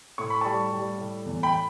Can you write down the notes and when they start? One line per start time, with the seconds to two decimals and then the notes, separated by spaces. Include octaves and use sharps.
0.18 A2 C#6
0.30 B5
0.41 G3 A5 C#6
0.73 G3
0.98 A2
1.25 E2
1.43 G5 B5